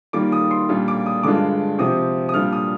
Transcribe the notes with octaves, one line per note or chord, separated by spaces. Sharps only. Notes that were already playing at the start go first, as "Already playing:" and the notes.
D#3 G3 A#3 F4 D6
D#6
C6
A#2 G3 D4 F4
D6
D#6
G2 D3 G#3 D4 F4 D6
C3 F3 C4 D#6
D#6
A#2 G3 D4 F4 F6
D#6